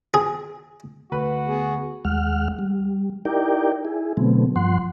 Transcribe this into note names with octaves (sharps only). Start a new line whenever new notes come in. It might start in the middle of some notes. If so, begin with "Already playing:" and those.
G#4
D2 F#4 B4
B3 G#4
D#2 G#3 F#5 F6
G3
D#4 E4 G4 A#4 D5 G5
E4 G#4
B2 D3 F#3 A3 B3 C4
G2 F3 F#5 C6